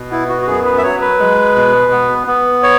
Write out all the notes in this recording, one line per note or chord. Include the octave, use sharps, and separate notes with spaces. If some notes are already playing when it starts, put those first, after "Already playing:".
Already playing: B2
B3 E4
F#4
F#4
F#2 G#4
B4
E5
F#3 C#5
B4
G#3
B2
B3
B3
C#5